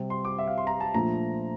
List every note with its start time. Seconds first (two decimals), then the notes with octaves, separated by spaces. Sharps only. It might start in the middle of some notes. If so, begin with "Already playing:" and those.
Already playing: C3 G3 C4
0.10 C6
0.25 D6
0.39 E5
0.48 F5
0.58 C6
0.67 A#5
0.80 A5
0.94 A#2 F3 A3 D4 A#5